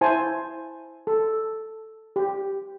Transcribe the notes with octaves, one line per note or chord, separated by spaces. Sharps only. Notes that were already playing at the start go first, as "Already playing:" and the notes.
E4 C5 G#5 A5
A4
G4